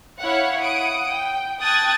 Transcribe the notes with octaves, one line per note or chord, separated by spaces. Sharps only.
E4 C#5 F5 F#5
F#5 D#6 D7
G5
G5 A5 D#6 F#6 G#6 A6